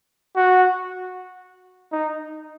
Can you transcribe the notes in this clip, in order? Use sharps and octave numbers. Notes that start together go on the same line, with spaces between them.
F#4
D#4